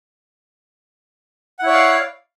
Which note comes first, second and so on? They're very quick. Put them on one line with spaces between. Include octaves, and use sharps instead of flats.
F#5 E4 C#5 D5 F5